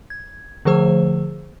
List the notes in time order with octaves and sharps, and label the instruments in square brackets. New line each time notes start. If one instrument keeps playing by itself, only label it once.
[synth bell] G#6
D3 F3 A3 G#4 C5 E6